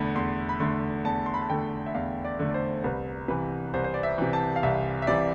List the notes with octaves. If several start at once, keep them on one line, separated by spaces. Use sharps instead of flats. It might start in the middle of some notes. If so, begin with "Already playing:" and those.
Already playing: E2 D3 A3 B5
E2 C6
B5
D3 A3 C6
E2 A5
C6
B5
A5
D3 A3 G5
E5
E2 F5
D5
D3 A3
D5
C5
C2 B4
C3 E3 B4
C2 C5
C5
D5
E5
C3 E3
A5
F5
C2 E5
E5
C3 E3 D5